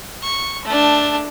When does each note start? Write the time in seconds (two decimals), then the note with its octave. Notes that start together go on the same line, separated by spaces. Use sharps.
0.23 C#6
0.65 A3 D4